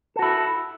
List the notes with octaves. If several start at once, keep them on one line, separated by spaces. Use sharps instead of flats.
E4 F#4 A4